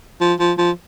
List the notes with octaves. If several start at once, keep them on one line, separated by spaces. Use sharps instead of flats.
F3
F3
F3